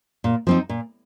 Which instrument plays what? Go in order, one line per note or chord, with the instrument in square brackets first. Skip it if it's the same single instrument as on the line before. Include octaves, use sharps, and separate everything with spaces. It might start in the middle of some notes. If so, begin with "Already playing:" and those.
[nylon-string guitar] A#2
F3 C4 D#4
A#2